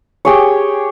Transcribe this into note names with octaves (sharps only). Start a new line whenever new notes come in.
G4 G#4 C#5